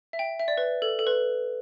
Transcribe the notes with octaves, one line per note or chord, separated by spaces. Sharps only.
E5
G5
E5
D5
B4
A4
A4
B4